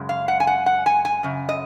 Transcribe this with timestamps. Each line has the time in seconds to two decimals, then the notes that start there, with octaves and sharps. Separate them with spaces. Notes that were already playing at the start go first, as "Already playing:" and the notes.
Already playing: F#2 C#3 G#3
0.09 F5
0.28 F#5
0.40 G#5
0.47 F#5
0.66 F#5
0.86 G#5
1.05 G#5
1.23 F#2 C#3
1.49 D#5